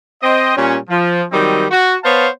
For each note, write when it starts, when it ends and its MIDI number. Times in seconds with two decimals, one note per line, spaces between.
0.23 0.54 60
0.23 0.54 75
0.56 0.78 46
0.56 0.78 55
0.56 0.78 61
0.89 1.22 53
1.32 1.65 51
1.32 1.65 54
1.32 1.65 55
1.32 1.65 60
1.32 1.65 63
1.70 1.96 66
2.04 2.28 59
2.04 2.28 72
2.04 2.28 73
2.04 2.28 77
2.04 2.28 81